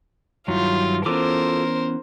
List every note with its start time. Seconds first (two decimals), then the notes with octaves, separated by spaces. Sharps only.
0.48 G2 D#3 F#3 E4 F4
1.06 E3 B3 C#4 F4 A4 A#4 C5 D6